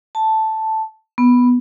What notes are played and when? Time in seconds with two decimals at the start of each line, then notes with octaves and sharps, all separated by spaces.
0.15 A5
1.18 B3